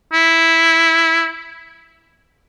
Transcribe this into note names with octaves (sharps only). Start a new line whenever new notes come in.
E4